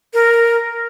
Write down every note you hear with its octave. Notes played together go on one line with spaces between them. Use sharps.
A#4